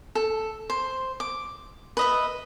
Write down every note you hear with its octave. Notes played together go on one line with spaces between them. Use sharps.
A4
C5
D6
B4 D#5 E5